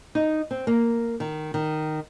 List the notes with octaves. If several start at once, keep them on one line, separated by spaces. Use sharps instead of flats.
D#4
C4
A#3
D#3
D#3